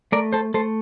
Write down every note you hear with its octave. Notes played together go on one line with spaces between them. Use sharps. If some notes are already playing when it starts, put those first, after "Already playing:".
A3 A#4 D5
A4 C5
A3 A4 C5